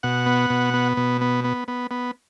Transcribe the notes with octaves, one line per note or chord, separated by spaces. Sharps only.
B2 F#5
B3
B2
B3
B2
B3
B3
B3
B3